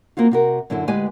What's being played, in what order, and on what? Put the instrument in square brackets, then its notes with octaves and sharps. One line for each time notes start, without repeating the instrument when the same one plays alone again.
[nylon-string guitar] A#3 C4 F4 F#4
C3 F#4 A#4
F#2 D3 E4 A4
D2 G#3 G4 B4 G#5